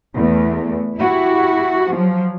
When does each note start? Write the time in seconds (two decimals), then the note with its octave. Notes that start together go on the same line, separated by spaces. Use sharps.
0.15 E2 A3
0.97 E4 F#4 G4
1.90 F3 F#3